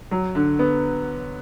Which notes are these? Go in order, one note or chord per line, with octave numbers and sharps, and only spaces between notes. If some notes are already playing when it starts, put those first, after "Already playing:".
F#3
D3
B3